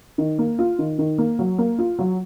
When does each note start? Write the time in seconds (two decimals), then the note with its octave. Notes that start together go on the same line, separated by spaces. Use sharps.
0.18 D#3
0.39 A#3
0.59 F4
0.79 D#3
0.99 D#3
1.18 A#3
1.39 F#3
1.58 A#3
1.79 F4
1.99 F#3